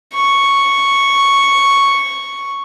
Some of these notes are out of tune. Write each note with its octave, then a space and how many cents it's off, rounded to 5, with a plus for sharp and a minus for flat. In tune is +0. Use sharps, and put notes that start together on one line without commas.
C#6 +0